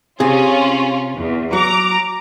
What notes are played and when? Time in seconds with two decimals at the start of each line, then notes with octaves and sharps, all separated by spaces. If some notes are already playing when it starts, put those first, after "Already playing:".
0.20 C3 C#4 F4 G#4
1.15 E2
1.53 F#3 A#5 D6